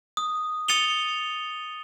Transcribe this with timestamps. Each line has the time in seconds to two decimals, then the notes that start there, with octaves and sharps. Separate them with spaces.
0.17 D#6
0.68 D#6 A6 C#7 D#7 F7 G7